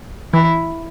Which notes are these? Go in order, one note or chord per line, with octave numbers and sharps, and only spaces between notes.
E3 E4